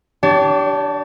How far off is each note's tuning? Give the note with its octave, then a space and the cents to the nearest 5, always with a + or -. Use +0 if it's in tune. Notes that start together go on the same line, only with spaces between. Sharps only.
D4 +0 G4 -15 C#5 +45